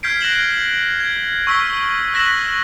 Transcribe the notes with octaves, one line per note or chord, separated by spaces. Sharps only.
F6 G6 G#6 B6 C7 D7
F#6 A#6 C7 E7 F#7 G7
G#6
C#6 E6 F6 B6 G7
E6 F#6 A#6 B6 E7 F#7